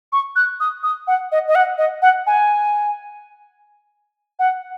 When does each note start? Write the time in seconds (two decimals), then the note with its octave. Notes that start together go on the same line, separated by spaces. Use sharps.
0.12 C#6
0.36 F#6
0.60 D#6
0.83 D#6
1.07 F#5
1.32 D#5
1.48 D#5
1.55 F#5
1.78 D#5
2.02 F#5
2.27 G#5
4.39 F#5